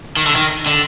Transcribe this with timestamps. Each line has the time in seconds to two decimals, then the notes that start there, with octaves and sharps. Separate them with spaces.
0.17 D#3
0.26 D3
0.36 D#3
0.66 D3